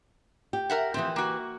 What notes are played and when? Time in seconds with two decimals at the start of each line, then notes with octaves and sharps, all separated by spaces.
0.53 G4
0.70 A#4 E5 F#5
0.94 E3 F3 C4 G4
1.16 A#3 F#4